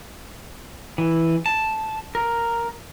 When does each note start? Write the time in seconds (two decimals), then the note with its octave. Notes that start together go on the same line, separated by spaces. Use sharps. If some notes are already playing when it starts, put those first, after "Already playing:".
0.98 E3
1.46 A5
2.15 A#4